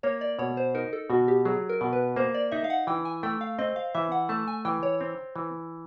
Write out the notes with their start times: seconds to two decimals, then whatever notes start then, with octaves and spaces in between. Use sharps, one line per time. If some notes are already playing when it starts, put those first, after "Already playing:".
0.03 A#3 C#5
0.21 D5
0.39 B2 C#5
0.57 C5
0.75 D#4 A#4
0.93 A4
1.10 B2 F#4
1.28 G4
1.45 F#3 G#4
1.69 A#4
1.81 B2
1.93 B4
2.16 A#3 C5
2.34 D5
2.51 D#4 E5
2.64 F5
2.70 F#5
2.87 E3 G5
3.05 G#5
3.23 A3 G5
3.41 F5
3.59 C4 D#5
3.76 F5
3.94 E3 E5
4.12 F#5
4.29 A3 A5
4.47 G#5
4.65 E3 G5
4.83 C#5
5.01 C4
5.36 E3